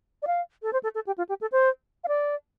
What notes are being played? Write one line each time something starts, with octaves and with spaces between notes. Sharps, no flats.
D5
F5
A4
C5
A4
A4
G4
F4
G4
A4
C5
F5
D5